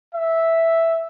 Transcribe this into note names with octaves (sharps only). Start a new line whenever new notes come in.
E5